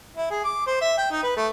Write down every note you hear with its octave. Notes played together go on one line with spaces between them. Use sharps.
E4
G#4
D6
C5
E5
G5
D#4
B4
A3